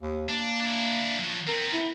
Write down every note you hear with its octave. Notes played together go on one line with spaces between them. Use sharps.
D#2
A#3 D4
D4 E4
F3 F#3
B3 C4 A#4
E4